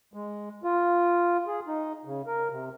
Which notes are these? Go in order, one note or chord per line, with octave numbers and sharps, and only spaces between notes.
G#3
F4
G#4
D#4
C#3
A#4
C3